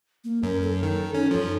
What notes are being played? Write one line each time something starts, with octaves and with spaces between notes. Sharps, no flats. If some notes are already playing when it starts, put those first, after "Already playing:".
A#3
F#2 A#4
A4
D#3
C#4 D#4
F#2 F3 A4